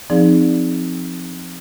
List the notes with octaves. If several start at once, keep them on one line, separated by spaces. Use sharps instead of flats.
F3 C4 D#4 G#4 D5